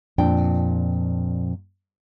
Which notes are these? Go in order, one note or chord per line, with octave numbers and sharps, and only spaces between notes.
F2 A#2 D4 G5